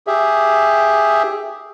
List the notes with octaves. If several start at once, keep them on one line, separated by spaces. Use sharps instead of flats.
G4 G#4 E5